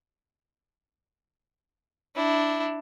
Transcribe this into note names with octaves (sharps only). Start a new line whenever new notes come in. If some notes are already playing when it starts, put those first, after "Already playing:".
D4 E4